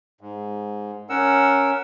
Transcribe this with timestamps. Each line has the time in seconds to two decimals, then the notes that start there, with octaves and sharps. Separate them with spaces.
0.21 G#2
1.09 C#4 A#4 F#5 E6